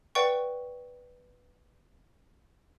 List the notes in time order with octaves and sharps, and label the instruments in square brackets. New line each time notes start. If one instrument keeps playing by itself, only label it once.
[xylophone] B4 D5 F#5 G5 C#6